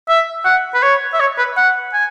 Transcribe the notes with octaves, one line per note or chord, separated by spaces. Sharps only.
E5
F#5
B4
C#5
E5
C#5
B4
F#5
G#5